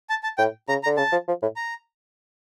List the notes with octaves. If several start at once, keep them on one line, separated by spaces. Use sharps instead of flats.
A5
A5
A2 G5
C#3 A#5
A#5
D3
C#3 A5
F3
F3
A2
A#5